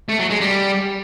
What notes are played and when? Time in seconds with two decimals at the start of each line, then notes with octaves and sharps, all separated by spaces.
0.09 A3
0.19 F#3
0.30 G#3
0.41 G3